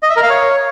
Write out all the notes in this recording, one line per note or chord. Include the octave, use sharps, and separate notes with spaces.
D#5
E5
A#4
F5
C#5